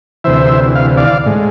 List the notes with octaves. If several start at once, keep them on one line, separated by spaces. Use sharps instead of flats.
D2 C3 E3 C5 E5
F5
D5 F5
A2 G#3